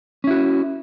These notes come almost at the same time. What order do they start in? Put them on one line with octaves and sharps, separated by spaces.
C#4 E4 F#4